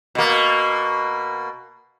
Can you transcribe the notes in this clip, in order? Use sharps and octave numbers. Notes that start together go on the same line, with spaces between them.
B2 A#3